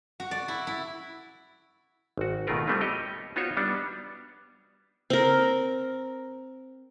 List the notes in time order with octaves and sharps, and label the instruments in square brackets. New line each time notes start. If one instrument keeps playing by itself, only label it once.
[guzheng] F#4
D5
E4
E4
[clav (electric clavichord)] G#1 F#4
B2 D#3 A3 F4 A#4 B4
G3 A3 B3 C4 F4
G4 C#5 D#5
B3 D#4 F4 F#4 C5 C#5
G3 B3 D4
[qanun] C4 A#4